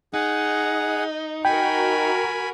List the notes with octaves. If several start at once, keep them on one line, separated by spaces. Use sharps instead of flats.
D#4 G#4 F#5
F#4 A#4 G5 G#5 B5